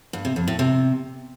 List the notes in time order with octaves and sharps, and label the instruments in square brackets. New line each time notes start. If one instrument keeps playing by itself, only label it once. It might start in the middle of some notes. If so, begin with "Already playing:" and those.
[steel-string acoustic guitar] G2
C3
F2
A2
C3